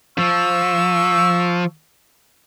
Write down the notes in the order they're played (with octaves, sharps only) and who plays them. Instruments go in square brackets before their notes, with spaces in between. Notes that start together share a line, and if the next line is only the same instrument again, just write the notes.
[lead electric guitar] F3 [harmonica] C#6 E6